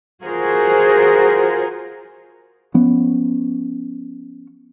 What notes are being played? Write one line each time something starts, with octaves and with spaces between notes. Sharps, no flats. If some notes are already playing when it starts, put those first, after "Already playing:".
F4 F#4 G#4 A#4 C5
F3 B3 C#4